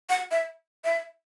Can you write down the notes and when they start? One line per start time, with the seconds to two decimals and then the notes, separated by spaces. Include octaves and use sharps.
0.10 F#5
0.31 E5
0.84 E5